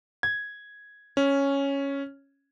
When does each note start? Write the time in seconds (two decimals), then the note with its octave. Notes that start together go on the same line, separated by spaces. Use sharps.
0.23 G#6
1.17 C#4